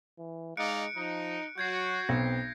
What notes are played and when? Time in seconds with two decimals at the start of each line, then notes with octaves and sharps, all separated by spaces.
0.18 E3
0.57 G#3 D#4 D5 F5 F#6 C#7 D7
0.96 F3 D#4
1.58 F#3 F#4 G6 G#6 C7
2.09 B1 C4 A#6